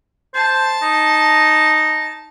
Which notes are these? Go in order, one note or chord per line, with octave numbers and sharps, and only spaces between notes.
C5 A5
D#4